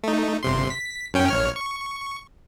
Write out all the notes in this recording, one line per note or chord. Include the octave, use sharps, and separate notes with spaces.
A3 D#4
G1 C3 C6
B6
F#2 C#4 G5
A#1 C#5 F6
C#6